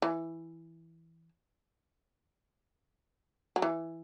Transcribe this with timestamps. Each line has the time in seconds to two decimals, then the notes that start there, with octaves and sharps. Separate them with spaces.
0.02 E3
3.56 F#3
3.62 E3